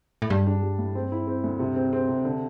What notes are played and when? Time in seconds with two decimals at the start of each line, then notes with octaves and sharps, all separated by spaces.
0.22 A2
0.30 G2 G3
0.47 D4
0.62 G3
0.78 A2
0.95 C4
1.12 E4
1.27 C4
1.44 D2
1.59 C3
1.76 C4
1.93 C4
2.08 C3
2.25 D3